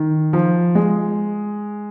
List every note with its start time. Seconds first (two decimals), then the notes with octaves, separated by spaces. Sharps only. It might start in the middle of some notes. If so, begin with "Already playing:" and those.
Already playing: D#3
0.33 F3
0.75 G#3